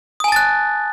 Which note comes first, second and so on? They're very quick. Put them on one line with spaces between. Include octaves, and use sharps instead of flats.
D#6 G#5 A5 A6 F#6